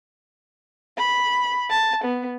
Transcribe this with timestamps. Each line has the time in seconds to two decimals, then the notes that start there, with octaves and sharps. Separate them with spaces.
0.97 B5
1.70 A5
2.04 B3